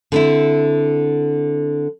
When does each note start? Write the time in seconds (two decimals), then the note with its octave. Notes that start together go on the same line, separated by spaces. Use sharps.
0.12 D3 C4 E4